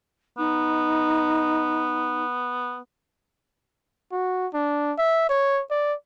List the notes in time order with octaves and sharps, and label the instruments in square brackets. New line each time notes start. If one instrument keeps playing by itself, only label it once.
[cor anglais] B3 [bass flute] D#4
[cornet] F#4
D4
E5
C#5
D5